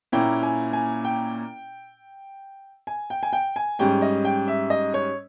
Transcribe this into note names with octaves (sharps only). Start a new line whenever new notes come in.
A#2 A#3 C#4 E4 G5
G#5
G#5
G5
G#5
G5
G#5
G5
G#5
G#2 G3 C#4 G5
D#5
G5
E5
D#5
C#5